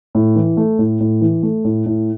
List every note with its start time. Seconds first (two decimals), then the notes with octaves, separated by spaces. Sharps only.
0.15 A2
0.36 E3
0.57 A3
0.79 A2
1.00 A2
1.21 E3
1.43 A3
1.65 A2
1.86 A2